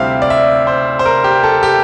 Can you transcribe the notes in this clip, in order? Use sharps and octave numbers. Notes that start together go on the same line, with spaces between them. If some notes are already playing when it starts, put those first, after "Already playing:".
Already playing: D2 C3 G3 C4 E4 E5 F5
D5
E5
C5
C5
A#4
G4
A4
G4